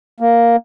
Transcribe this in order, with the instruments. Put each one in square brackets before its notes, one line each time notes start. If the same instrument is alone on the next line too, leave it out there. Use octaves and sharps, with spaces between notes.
[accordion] A#3